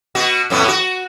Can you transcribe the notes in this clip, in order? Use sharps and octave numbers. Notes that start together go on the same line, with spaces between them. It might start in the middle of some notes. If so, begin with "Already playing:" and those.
B2 F#4
F2 A2 B3
F#4